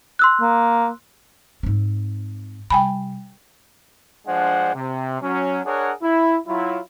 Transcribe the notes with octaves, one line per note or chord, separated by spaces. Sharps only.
C6 E6 F#6
A#3
G#2 C4
C3 G3 G5 G#5 B5
G2 F3 G#3 D4 C5 F#5
C3
F#3 C#4
D4 G#4 A#4 C#5 F#5
E4
F#3 E4 F4